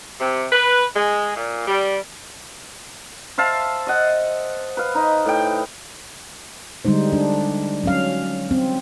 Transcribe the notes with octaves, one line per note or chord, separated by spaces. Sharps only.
C3
B4
G#3
A#2
G3
C5 E5 F5 A5
D#5 F#5
B4 F5
D#4
A2 G5
D3 G3 G#3 D#4 C5
D4
F#3 C#4 F5
C4